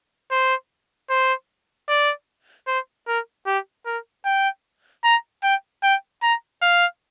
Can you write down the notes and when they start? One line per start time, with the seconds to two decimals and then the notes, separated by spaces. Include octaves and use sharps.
0.31 C5
1.10 C5
1.89 D5
2.67 C5
3.07 A#4
3.47 G4
3.86 A#4
4.25 G5
5.04 A#5
5.43 G5
5.83 G5
6.22 A#5
6.62 F5